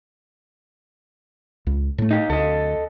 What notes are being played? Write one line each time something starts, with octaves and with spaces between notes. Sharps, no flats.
C#2
A2 A3
D#4 G4
D2 A4 D#5